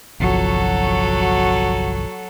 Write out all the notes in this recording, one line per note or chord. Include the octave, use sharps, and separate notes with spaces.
G1 C2 F3 F#3 F#4 A4